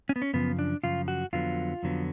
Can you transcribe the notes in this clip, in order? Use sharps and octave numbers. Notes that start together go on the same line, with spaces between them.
C#4
B3
C#4
F#2 C#3 F3 B3
D4
F#2 C#3 F3 F4
F#4
F2 D3 F#3 B3 F4
F2 D3 F#3 B3